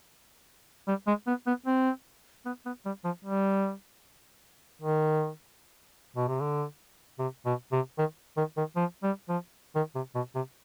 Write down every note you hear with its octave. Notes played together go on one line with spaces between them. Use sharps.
G3
G#3
B3
B3
C4
B3
B3
G3
F3
G3
D#3
B2
C3
D3
C3
B2
C3
D#3
D#3
D#3
F3
G3
F3
D#3
C3
B2
C3